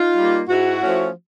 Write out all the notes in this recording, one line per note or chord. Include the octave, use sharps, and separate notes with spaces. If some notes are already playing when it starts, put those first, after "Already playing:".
Already playing: D#4 F4
G3 A#3
G#2 E4 F#4
F3 A3 C#4